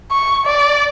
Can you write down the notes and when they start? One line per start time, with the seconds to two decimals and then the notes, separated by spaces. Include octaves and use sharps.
0.11 C#6
0.46 D5